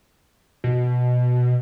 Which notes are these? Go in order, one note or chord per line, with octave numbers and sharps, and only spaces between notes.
B2